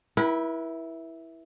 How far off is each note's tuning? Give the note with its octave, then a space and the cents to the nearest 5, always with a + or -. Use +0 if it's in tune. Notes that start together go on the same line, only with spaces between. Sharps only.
E4 -5 B4 -45 G5 -40